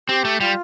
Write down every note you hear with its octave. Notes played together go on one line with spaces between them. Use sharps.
C4 G4
A3
G3 F4